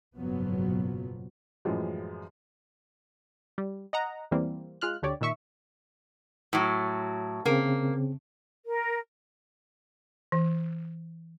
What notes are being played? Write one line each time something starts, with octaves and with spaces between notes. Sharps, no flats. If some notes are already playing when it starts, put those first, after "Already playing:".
F#1 G#2 B2 F3 F#3 B3
F#2 A2 E3 F3 G#3
G3
D#5 F#5 A#5
E2 E3 G3 A#3 C4
G#3 F4 F6 F#6
D2 D3 G4 C#5 D5
A#2 D#3 E5 C#6
A2 F#3
C#3 A#3 C4
A#4
E3